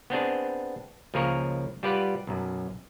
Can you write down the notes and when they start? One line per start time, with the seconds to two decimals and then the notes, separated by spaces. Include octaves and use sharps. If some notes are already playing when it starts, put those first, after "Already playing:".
0.10 B3 C4 D4 G#4
1.14 C#2 F3 A#3 G#4 A#4 C#5
1.83 G3 F4 G4 B4 D5 F#5
2.27 B1 F#2